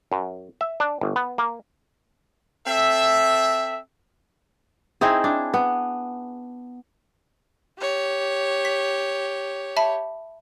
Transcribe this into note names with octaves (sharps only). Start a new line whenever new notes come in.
F#2
E5
D4
G1
B3
A#3
C4 A4 E5
C4 D#4 E4 G#4
D4
B3
G4 C#5
B6
E5 A5 B5